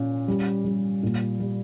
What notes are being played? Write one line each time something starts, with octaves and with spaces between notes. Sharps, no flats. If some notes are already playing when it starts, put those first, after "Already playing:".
Already playing: A#2 C#4
G3
G3
A#2
G3